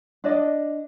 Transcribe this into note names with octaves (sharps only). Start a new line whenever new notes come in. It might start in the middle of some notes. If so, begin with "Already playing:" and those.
D4 D5 D#5